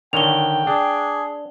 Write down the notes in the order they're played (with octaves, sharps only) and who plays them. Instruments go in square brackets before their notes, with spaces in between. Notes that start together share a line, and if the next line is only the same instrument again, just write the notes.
[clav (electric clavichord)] D3 D#3 C#5 [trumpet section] G5 [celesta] F7 G7
[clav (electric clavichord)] D4 [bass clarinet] G#4